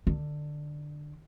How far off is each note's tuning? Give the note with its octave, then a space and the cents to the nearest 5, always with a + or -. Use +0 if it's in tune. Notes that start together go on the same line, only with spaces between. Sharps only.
D3 +15